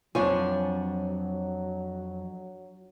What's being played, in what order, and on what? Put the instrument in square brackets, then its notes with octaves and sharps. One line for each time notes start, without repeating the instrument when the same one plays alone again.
[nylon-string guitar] F2 C#5 G#5 [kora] F3 D4 [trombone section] F#3